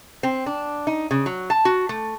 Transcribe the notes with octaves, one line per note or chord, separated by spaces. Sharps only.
C4
D4
D#4
C#3
F#3
A5
F#4
A3